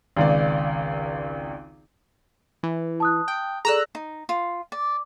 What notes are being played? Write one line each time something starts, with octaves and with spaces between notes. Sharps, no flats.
G#1 C#2 D5
E3
A5 D#6 F#6
G5
G#4 A4 D5 A#5 E6 F#6
D#4
F4
D5